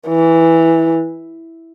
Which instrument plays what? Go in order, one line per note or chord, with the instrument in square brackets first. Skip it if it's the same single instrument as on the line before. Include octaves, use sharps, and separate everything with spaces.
[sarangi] E3